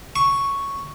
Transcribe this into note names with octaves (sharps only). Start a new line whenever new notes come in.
C#6